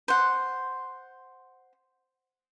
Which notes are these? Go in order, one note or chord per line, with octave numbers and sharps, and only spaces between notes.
C5 F#5